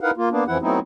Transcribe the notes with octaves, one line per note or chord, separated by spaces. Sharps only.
D#4 E4 A#4 B4 F5 F#5
A#3 F4
A#3 B3 D4
F2 E3 F3 E4 F#5
F#3 A3 B3 C4 D#4 E4